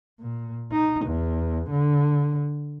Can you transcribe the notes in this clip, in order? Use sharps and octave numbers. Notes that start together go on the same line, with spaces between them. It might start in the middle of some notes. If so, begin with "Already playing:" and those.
A#2
D#4
E2
D3